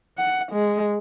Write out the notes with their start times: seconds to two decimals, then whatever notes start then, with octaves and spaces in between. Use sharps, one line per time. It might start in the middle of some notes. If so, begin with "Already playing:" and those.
0.18 F#5
0.52 G#3